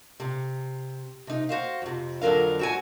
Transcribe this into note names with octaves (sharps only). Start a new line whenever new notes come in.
C3
C3 D#4
F#4 C5 F5
F2 C3
F2 D3 F#3 A#4 F5
C4 F#4 G#5